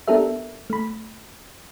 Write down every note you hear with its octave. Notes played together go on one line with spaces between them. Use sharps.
B3 D4 G4 A4 A#4 E5
A3 B5